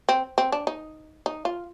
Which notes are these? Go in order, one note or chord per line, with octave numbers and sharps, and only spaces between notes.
C4
C4
D4
D#4
D#4
F4